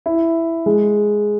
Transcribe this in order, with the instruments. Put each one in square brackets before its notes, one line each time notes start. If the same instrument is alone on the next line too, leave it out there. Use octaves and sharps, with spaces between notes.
[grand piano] E4
G#3